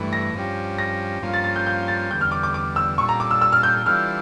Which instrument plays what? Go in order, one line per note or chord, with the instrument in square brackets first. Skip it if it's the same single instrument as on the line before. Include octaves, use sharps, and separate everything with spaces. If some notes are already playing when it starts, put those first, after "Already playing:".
Already playing: [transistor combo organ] G2 E3 A3
[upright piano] A#6
[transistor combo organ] G2 F3 C#4 G4
[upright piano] A#6
[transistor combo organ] G2 F3 A#3 C#4 F4
[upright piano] A6
A6
G6
G6
A6
[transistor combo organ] E2 D3 G3 [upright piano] G6
[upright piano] F6
D6
D6
D6
E6
[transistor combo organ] A#2 G3 D4 A4 [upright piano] C#6
[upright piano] A#5
D6
E6
E6
F6
G6
[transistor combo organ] E3 G3 D4 F4 A4 [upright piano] F6